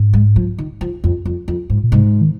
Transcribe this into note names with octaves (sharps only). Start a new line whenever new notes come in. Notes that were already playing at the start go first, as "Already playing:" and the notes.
Already playing: G#2
G#3
F3
D#3
F3
F2
F2
F2
G#2
A#2
G#2 C3
D#3